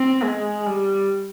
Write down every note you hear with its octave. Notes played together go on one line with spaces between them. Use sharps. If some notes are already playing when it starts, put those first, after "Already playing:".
Already playing: C4
G#3
G3